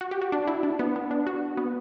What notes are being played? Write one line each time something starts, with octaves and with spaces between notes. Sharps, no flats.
F#4
G4
F#4
D4
E4
D4
B3
B3
D4
F#4
B3